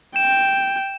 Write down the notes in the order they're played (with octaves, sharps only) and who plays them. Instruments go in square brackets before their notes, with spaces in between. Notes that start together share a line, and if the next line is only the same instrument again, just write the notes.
[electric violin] G5 [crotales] E7